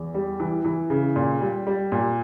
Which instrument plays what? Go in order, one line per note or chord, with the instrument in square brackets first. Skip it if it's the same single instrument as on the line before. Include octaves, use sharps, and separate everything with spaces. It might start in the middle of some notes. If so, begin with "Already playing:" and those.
Already playing: [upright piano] E2
G3
E3
E3
C#3
A#2
G3
G3
A#2